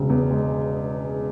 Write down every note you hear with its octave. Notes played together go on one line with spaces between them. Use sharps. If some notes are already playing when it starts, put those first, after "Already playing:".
Already playing: E1 C#3
E2
G#3